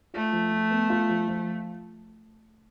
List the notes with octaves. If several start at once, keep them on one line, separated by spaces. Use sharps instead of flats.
A3 F4
F3
F3
B3
F4
F3
F3